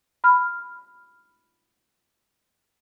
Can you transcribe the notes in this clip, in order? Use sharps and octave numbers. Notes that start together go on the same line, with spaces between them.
B5 F6